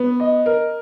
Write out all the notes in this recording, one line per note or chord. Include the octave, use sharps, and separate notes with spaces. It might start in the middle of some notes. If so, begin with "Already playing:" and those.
Already playing: B3
D#5
A#4